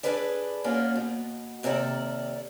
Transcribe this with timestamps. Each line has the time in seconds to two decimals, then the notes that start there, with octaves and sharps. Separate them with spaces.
0.03 D4 D#4 G#4 A4 B4 D5
0.64 A#3 C#4 D4 F4 F#4
0.96 B2
1.63 D#2 C3 A4 A#4 D5